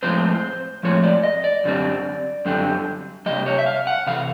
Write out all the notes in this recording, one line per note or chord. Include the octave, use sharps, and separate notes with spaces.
A2 F3 G#3 C4 C5
A2 F3 G#3 C4 C#5
D5
D#5
D5
F#2 D3 G3 C4
F#2 D3 G3 C4
C3 E3 G3 D#5
C#5
E5
F5
F#5
C3 E3 F5